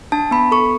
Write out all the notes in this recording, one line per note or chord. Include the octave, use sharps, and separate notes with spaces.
D4 A5
B3 B5
A4 C#6